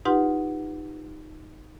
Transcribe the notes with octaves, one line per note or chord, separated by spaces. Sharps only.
D#4 F4 G4 B4 F#5 C6